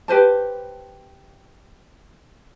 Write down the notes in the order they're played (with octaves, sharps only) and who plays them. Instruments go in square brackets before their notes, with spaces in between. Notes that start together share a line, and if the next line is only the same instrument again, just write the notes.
[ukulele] G4 B4 C5 A5